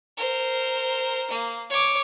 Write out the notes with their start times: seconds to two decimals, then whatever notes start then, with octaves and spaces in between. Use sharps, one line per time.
0.17 A#4 C5
1.31 A#3
1.70 C#5 D6